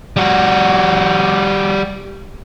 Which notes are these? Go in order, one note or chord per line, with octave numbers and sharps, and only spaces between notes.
G3 F#4